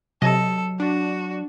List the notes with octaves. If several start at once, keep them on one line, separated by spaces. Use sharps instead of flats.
C3 F#3 A4 D#5
D4 F#4